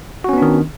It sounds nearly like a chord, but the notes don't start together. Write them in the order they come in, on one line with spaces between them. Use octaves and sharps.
F#4 C#4 B3 D4 D#3